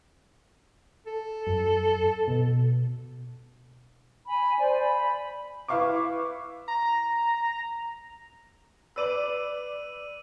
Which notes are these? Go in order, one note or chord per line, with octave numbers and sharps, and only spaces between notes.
A4
F#2
B2
G#5 B5
C5 D5 G#5
B5
E4 B4 E5 F5 C#6 D6
A#5
B4 D5 D6 E6 D#7 F#7